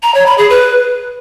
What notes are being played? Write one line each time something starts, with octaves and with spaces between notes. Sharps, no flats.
A#5
C#5
B5
G#4
B4